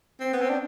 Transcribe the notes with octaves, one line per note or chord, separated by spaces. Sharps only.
C4
B3
C4
D4